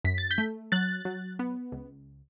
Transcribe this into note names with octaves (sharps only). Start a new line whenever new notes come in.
F#2 B6
A6
G6 B6
A3
F#3 F#6 A6
F#3
B3
C#2